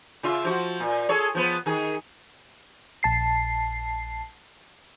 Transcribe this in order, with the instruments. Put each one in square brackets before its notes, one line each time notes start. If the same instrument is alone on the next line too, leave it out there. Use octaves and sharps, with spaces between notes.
[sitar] C#3 F4 E5
F3 F#4
A#2
G#4 A4 C#5
F3 B3
D#3 G#4
[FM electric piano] A#1 A5 C7